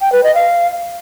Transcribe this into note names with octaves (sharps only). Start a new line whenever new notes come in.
G5
B4
D#5
F5